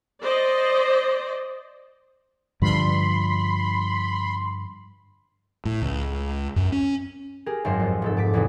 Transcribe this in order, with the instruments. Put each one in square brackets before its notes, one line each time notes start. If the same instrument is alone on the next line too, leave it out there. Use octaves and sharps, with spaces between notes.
[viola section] C5 D5 D#5
[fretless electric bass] G2 D3 F3 [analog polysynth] B5 C6
[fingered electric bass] A2
C#2
F#2
C#4
[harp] G4 G#4 A#4
G#1 F#2 A#4 C5 E7
F2
F1 G#2 A4
G#2 A5 D6 B6
E2 G#2 C3